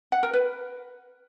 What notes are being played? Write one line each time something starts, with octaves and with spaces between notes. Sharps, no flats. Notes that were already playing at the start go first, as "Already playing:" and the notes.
F#5
A#4
B4